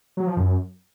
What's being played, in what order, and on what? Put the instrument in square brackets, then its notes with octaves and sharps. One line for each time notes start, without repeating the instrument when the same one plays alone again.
[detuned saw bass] F#3
F3
F#2